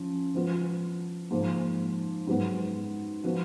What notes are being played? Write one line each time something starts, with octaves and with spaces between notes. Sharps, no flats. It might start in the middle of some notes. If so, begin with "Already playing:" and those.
Already playing: F3 C#4
F3 B3 F4
G#2 F3 A#3
G#2 F#3 B3
F3 B3 F#4